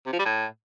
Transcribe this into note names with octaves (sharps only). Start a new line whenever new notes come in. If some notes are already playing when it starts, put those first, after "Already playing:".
C3
F3
G3
A2